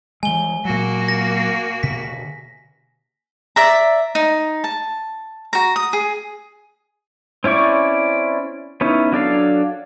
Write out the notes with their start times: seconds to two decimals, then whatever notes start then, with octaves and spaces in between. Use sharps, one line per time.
0.23 E3 G3 G#3 G#5 G7
0.65 A#2 F#3 A#3 F#4
1.08 A#6
1.83 B2 D3 B6
3.56 D5 E5 A#5
4.15 D#4
4.64 A5
5.53 F#4 A#5
5.76 D#6
5.93 G#4
7.44 C4 C#4 E4 D5 C#6
8.81 B3 C#4 D#4 E4
9.12 F#3 D4 A4 F5